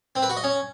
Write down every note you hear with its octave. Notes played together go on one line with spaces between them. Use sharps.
C4
B4
F#4
D#5
C#4